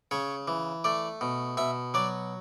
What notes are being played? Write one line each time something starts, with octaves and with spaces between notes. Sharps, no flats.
C#3 C#5
E3
A3 D5
B2
B2 E5
F#3 D5